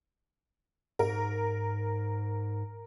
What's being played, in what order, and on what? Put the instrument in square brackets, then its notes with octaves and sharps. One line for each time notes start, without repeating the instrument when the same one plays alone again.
[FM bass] G#2 [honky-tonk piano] A#4